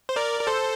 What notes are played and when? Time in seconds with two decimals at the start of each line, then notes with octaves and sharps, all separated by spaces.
0.09 C5
0.16 A#4 D5
0.41 A#4
0.47 A4 C5